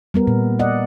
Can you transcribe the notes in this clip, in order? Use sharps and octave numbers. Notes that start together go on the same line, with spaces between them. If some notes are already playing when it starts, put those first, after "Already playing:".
G3 B3 A#4
A#2
D5 D#5 F#5